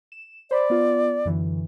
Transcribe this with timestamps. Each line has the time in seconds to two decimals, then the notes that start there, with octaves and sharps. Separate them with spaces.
0.12 E7
0.51 C5 D5 B5
0.70 B3 F4
1.25 F#2 D3 E3